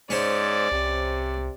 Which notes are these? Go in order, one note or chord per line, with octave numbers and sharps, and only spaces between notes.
G#2 C#4 C5 D5
C2 C3